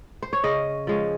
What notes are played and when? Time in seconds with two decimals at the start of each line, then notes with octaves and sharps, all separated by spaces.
0.22 C5
0.33 C#5
0.44 C#3 D#5
0.87 F3 G#3 C#4